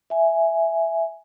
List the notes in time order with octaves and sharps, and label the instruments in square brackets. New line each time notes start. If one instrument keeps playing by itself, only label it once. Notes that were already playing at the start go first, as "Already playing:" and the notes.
[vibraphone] E5 G#5